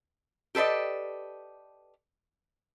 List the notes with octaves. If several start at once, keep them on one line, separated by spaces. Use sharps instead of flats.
G4 A4 B4 D5 D#5